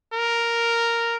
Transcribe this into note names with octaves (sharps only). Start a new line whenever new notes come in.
A#4